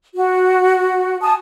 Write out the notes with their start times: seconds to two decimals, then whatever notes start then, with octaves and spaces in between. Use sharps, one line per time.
0.16 F#4
1.22 G#5 A5 D#6